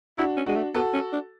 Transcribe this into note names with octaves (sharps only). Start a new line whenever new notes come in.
D4 E4 F#4
C#4
G#3 D4 F#4
A3
B3 F#4 A4
C#4
D4